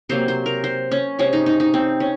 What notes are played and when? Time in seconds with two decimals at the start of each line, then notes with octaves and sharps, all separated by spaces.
0.09 C3 F#3 A#3 C5
0.28 C5
0.46 A#4
0.64 C5
0.91 C#4
1.19 C3 F3 G#3 C#4
1.33 D#4
1.46 D#4
1.60 D#4
1.74 C4
2.00 C#4